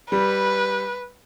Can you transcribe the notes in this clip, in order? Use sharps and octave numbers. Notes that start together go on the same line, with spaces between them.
G3 B4